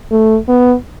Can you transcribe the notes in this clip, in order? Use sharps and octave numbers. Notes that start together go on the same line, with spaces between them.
A3
B3